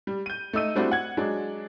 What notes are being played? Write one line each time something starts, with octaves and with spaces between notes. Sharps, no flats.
G3
G6 D#7
A3 D#4 E6 D#7
G3 A3 C4 D4 E4 F#4
F#5 G#6
F#3 G#3 D4